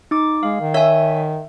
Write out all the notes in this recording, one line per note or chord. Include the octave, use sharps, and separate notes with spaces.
D#4 D6
G#3 F5
D#3
C#5 E5 G#5